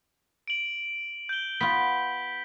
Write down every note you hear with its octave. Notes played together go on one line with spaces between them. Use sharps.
D7 F#7
G6 G7
B3 F4 B6